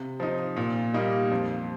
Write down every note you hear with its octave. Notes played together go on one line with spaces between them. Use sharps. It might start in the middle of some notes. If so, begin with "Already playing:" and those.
Already playing: C3
F3 D#4
A#2
G3 A#3 D#4
F2